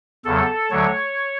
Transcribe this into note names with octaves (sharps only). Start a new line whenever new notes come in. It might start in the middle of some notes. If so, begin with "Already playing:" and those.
E2 C#3 F#3 A4
D2 D3 F#3 C#5